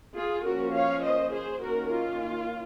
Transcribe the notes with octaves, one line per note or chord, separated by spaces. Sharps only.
F4 G#4
F3 A#3 C#4 F#4 A#4
C#5 F5
C5 D#5
G#4 C5
D#3 A#3 C#4 F#4 A#4
F4